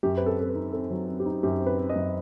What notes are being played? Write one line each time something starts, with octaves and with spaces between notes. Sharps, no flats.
F#2 G4
C4 B4
A4
C4 A4
B4
D#4
C4 A4
F#3
C4
G4
D#4
F#2 G4
C4
B4
C4
D#5
F#2